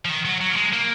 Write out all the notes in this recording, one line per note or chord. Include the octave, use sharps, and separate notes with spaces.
F3
D#3
F#3
F#3
A#3
G#3
A#3